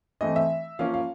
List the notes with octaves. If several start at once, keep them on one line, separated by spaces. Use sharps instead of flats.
E3 A3 C4 D#5
E5
F3 A#3 C#4 F5
F5